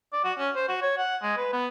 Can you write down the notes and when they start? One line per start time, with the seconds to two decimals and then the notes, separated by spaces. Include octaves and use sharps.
0.13 D5
0.24 F#4
0.38 C#4
0.55 C5
0.68 F#4
0.82 C#5
0.98 F#5
1.22 G#3
1.37 B4
1.53 B3